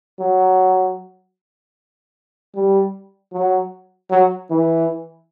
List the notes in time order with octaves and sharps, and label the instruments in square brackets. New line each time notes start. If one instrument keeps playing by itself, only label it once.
[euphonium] F#3
G3
F#3
F#3
E3